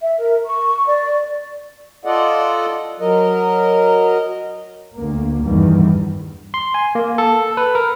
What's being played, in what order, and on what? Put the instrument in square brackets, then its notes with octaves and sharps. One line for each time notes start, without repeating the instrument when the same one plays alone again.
[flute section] E5
A#4
C#6
D5
[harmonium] F4 A4 D5 D#5 F#5
F#3 A#4 D#5
[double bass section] D2 A#3
E2 G2 D#3 E3 G3
[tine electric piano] C6
G#5
A#3
A4
B4
A#4